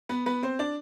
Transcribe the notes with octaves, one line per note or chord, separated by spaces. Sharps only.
B3 B4
B3 B4
C4 C5
D4 D5